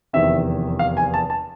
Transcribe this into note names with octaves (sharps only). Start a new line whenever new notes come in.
F1 E2 C3 D#3 E5
F5
G#5
A5
A5